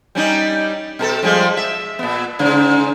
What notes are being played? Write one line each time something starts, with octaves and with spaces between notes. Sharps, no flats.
G3 C#4 D#4
B2 G#4 A4
F3 G3 G#3
E5
A#2 B3
G#2 C#3